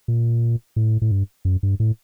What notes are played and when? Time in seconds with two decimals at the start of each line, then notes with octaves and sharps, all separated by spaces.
0.08 A#2
0.76 A2
1.02 A2
1.11 G2
1.45 F#2
1.63 G2
1.80 A2